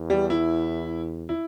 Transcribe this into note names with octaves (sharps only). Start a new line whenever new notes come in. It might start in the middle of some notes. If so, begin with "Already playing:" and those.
Already playing: E2
G3
E4
E4